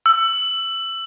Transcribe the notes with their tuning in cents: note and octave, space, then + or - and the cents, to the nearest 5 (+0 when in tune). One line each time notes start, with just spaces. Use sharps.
E6 +20